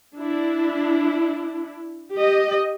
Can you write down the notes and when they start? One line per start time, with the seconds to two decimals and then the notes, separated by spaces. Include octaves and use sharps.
0.17 D4 E4
2.14 G4 D#5